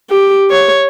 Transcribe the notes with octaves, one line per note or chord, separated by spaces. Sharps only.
G4
C#5